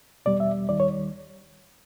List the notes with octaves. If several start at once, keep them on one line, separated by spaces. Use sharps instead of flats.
E2 B2 G3 D5
E5
D#2 D#3 G3 D5
C#5